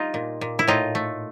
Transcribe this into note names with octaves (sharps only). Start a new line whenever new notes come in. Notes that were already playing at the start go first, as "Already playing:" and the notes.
Already playing: G3 D#4 F4
A#2
A#2
E4
A2 D#4 F4
A3